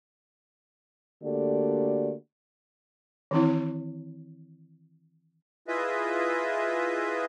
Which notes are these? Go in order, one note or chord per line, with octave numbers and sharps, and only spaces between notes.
D3 A3 A#3 F#4 G4 D5
D#3 E3 C4 E4
E4 F4 G#4 B4 D#5 E5